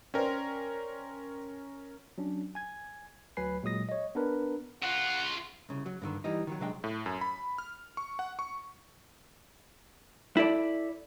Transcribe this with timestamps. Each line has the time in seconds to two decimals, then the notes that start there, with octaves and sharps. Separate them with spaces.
0.14 C#4 A#4 C5 D5 G5
2.18 F#3 C#4 D4
2.55 G#5 G#6
3.37 D2 F#3 B4 G#5 B5 C7
3.63 A#2 F#3 G#3 D#6 A#6
3.89 C#5 D#5
4.15 B3 D4 A#4 B4
4.83 C#3 F4 F#5
5.69 C2 C#3
5.86 F#3
6.02 G2 D3 D#3
6.24 E3 G3 D#4
6.47 D#3 E3 F#3
6.60 C3 F#3 G#3 D4 D#5 G5
6.84 A2
7.06 F#2
7.21 B5
7.58 F6
7.97 C#6
8.19 F#5
8.39 C#6
10.37 E4 A4 D5